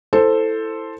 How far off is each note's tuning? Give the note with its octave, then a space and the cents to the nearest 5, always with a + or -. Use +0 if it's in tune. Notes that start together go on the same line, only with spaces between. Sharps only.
E4 +0 A4 +5 C5 +0